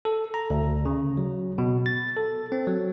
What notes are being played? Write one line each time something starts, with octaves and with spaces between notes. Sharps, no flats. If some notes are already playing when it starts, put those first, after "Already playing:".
A4
A#5
D2
C#3
F#3
B2
A6
A4
C4
F#3